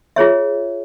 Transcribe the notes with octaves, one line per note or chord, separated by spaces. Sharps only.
F4 G#4 C#5 E5